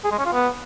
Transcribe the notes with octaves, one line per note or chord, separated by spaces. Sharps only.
G#4
G#3
C#4
F4
B3